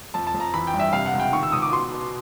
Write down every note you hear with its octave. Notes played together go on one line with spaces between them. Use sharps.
F2 A5
A5
F2
A#5
E3 B5
G5
G2
E5
C3 F5
F#5
C#2
G5
D#3 C#6
E6
C#2 D#6
D6
B2 C6
B2